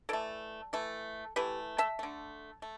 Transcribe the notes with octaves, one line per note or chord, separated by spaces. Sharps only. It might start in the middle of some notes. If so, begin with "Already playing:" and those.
E3 A3 A4 D5
E3 A3
E3 A3 G4 B4
E5 A5
D3 A3
A3